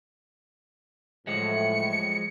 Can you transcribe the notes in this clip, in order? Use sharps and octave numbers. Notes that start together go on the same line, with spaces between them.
A2 F3 F#3 G#3 C#7